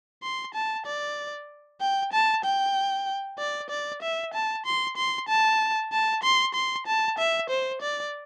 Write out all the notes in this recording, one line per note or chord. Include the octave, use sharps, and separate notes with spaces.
C6
A5
D5
G5
A5
G5
D5
D5
E5
A5
C6
C6
A5
A5
C6
C6
A5
E5
C5
D5